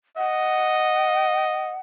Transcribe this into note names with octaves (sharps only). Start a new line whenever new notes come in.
D#5 F#5